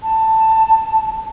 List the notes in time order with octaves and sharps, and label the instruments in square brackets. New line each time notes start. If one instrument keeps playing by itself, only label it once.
[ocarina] A5